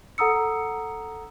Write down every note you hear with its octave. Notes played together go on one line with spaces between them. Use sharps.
A4 F#5 A#5 D#6 E6 C#7